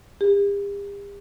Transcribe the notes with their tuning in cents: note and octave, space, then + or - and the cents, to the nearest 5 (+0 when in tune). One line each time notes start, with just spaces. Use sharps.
G4 +45